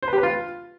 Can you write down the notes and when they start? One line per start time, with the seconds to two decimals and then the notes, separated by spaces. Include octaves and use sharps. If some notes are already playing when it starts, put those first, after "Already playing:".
0.03 C5
0.08 B4
0.13 G4
0.18 B4
0.23 F4